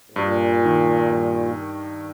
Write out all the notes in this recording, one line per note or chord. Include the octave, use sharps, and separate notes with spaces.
A2
G2 A#2
D#3
G2